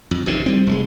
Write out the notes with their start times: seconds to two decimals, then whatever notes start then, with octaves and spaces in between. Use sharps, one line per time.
0.11 F2
0.26 A1 A2 C3 D#3
0.46 G3 C4
0.67 F1 A#2 G#3